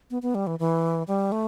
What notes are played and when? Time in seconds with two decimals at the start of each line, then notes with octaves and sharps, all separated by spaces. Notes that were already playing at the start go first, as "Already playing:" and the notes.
0.11 B3
0.22 B3
0.35 G3
0.47 E3
0.59 E3
1.08 G3
1.32 A3